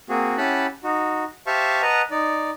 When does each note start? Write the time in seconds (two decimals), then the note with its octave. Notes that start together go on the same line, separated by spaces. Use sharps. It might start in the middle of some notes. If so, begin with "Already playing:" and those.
0.09 A#3 C4 F#4 G#4
0.37 C#4 E4 G4 F#5 A5 B5
0.84 D#4 F#4
1.47 G4 C5 E5 F5 A5 C#6
1.82 B4 D#5 F#5 A5 A#5
2.11 D#4 D5